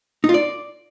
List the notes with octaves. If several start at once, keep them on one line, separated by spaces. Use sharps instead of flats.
D#4
F4
D5